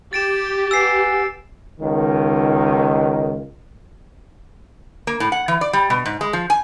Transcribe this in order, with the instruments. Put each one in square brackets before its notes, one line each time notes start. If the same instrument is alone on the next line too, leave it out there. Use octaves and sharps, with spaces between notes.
[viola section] G4 [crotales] A6 D7 E7
[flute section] B4 F#5 G#5 [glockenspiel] E6 C7
[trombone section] C#2 D#3
[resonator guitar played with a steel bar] A#3
A2
F#5
E3
D5
G3
B2
G#2
G#3
F3
G#5